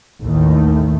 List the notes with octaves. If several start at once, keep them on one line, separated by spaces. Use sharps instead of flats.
A1 D#2 D#3 A3